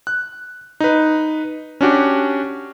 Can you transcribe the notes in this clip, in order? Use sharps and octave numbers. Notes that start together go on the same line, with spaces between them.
F#6
D#4 B4
C#4 D4 F#4 G4